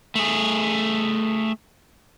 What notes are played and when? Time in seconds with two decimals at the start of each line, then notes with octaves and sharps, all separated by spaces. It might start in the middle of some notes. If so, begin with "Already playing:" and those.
0.15 A3 G#4